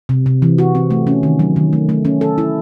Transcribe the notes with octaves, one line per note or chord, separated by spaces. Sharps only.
C3
C3
E3
F#4
C4
A3
C#4
D#3
F#3
D#3
A3
A3
C#4
A4
E4